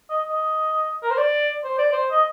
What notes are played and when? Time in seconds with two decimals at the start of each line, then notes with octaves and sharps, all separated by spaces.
0.10 D#5
0.29 D#5
1.03 A#4
1.10 C5
1.18 D5
1.64 C5
1.78 D5
1.92 C5
2.11 D#5